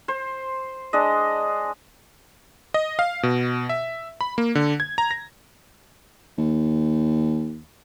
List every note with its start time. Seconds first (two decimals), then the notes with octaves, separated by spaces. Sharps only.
0.08 C5
0.93 G#3 D4 D#5
2.74 D#5
2.99 F5
3.23 B2
3.69 E5
4.21 B5
4.38 A#3
4.55 D3
4.80 G#6
4.98 A#5
5.11 A#6
6.38 D#2